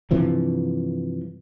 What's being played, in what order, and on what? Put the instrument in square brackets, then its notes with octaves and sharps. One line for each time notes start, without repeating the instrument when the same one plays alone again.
[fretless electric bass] G2 C3 E3 F3